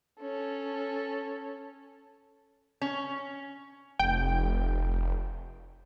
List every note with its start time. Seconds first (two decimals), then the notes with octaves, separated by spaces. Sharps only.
0.21 C#4 A4
2.81 C#4
3.99 F1 G5